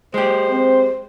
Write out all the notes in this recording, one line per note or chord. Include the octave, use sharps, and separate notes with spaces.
G#3 G4 C5
C4